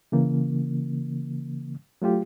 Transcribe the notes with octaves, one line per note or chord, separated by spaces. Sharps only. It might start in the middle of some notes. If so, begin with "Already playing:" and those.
C#3 E3 A#3
F#3 A3 F4 G4